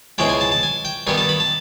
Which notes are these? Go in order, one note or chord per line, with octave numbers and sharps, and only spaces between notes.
C#2 B2 G#3 C4 E4 G5
G#5
A5
A5
G#5
G5
G2 D#3 G3 B3 G#5
A5
B5
A5